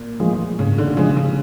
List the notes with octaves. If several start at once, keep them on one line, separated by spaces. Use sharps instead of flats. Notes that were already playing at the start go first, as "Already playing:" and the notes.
Already playing: A#2
A2 F3 G#3
G#2 C#3
D3
C#3 F3 G#3
C#3